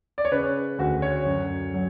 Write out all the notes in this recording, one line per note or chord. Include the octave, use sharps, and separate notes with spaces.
D5
C#5
C#3 B4
D2 F#4
C#5
F#2
F#3